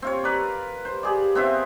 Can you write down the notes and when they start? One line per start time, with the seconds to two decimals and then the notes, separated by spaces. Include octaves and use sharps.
0.02 C4 F4 C#5
0.24 A#4 B4 D5
0.85 C5
1.03 G4 G#4 D5
1.35 B3 C4 E4 E5